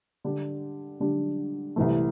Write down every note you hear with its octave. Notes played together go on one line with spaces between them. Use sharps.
D3 G3 D4 G4
D3 G3 D4 G4
C2 C3 E3 A3